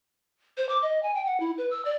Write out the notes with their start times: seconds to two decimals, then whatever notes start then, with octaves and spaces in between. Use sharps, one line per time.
0.57 C5
0.69 D6
0.82 D#5
1.03 G#5
1.15 G5
1.26 F#5
1.40 E4
1.58 B4
1.71 E6
1.85 D5